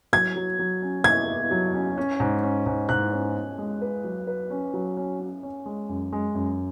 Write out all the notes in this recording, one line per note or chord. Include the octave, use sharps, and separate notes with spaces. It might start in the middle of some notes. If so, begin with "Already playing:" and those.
F#3 G#6
F#3
F#3
C#4
E4 G#6
E4
F#3
C#4
C#4
G#2
C#4
G#2
G#2 F#6
C#4
C#4
G#3
B4
F#3
B4
C#4
F#3
C#4
C#4
C#4
G#3
F#2
G#3
F#2